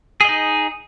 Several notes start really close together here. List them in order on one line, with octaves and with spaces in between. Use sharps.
G#4 D#5 D#4